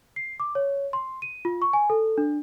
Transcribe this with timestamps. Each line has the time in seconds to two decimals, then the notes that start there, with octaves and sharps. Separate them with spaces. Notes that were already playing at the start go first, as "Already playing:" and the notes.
0.16 C7
0.40 D6
0.55 C#5
0.93 C6
1.22 D#7
1.45 F4
1.62 C#6
1.73 G#5
1.90 A4
2.18 D4